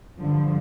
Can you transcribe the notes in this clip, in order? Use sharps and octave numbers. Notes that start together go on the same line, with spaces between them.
G2 D3 F3